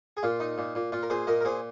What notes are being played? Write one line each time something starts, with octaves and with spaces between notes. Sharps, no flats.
G#4
A#2 F4
D#4
A#2
A#2
A#2 F4
A#4
A#2 G#4 C5
A#2 A#4 D#5
A#4
A#2 G#4 C5